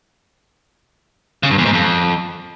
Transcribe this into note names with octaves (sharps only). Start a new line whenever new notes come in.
C#3
G2
E2
G#2
F2